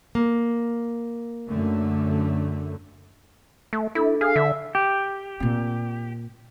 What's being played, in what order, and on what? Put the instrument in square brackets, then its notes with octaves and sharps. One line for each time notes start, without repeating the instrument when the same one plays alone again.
[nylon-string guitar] A#3
[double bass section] F#2 D3 A3
[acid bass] A3
[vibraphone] D4 A4 [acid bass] E4
[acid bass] G#4 [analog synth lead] F5
[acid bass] D3 [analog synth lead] E5
[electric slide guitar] G4
[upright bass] A#2 C4